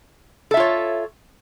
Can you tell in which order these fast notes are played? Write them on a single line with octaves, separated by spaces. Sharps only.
A4 E5 F4 C#5